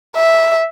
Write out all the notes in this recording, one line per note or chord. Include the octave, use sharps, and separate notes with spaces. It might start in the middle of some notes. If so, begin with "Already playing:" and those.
E5